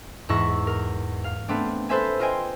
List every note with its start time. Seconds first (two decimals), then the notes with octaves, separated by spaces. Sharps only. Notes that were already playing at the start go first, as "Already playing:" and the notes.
0.29 E2 G#2 E4 E5 C#6 A#6
0.67 A#4
1.24 F5
1.48 A3 B3 C4 D4
1.89 A4 B4 C5 E5 G#5
2.19 F4 C5 D#5 G5 G#5